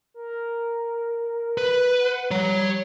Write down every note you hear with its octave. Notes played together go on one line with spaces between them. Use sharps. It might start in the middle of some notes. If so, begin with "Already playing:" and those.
A#4
B4
F#5
G3 C#5 A#5